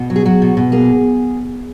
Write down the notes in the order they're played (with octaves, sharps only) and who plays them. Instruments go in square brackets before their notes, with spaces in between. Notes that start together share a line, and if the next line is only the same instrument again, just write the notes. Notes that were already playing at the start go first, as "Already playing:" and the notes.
Already playing: [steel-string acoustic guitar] B2
F#3
G#4
F#3 F#4
B2
B2
A#3 G#4